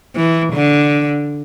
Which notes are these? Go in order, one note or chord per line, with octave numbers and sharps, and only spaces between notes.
E3
D3